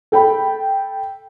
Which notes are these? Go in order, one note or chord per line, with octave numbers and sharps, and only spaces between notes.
A4 G5 B5